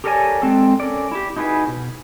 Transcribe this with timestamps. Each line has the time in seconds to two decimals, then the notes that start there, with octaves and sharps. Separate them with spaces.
0.04 G4 A4 A#4 C#5 D5 G#5
0.42 G#3 C4 A4
0.80 C#4 A4 A#4 D5
1.12 E4 G4
1.36 D#4 E4 F#4 G#4 B4
1.67 B2